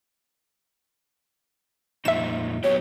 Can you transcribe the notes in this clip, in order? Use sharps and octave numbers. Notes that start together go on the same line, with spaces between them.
F2 A#2 D#4 E5 E7
F#3 B3 G4 C#5